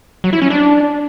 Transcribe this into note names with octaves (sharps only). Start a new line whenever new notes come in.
F#3
E4
C#4
D4